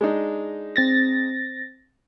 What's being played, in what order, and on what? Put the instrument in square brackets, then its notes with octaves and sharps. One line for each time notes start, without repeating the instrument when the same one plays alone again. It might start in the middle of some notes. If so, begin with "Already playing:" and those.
[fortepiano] G#3 D4 D#4
[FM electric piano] C4 A6 A#6